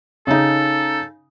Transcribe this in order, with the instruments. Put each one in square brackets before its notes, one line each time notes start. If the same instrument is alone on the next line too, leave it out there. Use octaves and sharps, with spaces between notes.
[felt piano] C#3 D#4 [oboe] A4